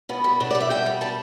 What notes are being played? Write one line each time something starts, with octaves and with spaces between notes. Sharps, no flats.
B2 B3
G3
B2 D4
D5
G3
E5
B2 G5
G3
G3 A5